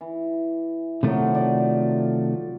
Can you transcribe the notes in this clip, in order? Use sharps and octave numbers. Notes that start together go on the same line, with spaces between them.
E3
C3 D#3 F3 F#3 A3
D5